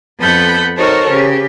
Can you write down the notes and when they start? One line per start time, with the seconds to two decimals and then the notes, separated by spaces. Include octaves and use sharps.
0.19 F2 B3 A4 F#5 B5 G6
0.78 D#4 F#4 A4 A#4 C5 C#5
1.10 C#3 G4